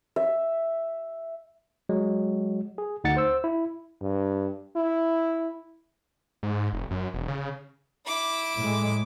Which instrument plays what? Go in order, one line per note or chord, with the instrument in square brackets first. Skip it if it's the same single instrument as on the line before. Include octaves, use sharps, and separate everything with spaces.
[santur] E5
[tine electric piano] F#3 G#3
G#4
D2 D#4 F#5 A6 C#7
C5 E6
E4
[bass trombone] G2
E4
[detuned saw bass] G#2
F1
F#2
E1
C#3
[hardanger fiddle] E4 D6
[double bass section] A2 G#3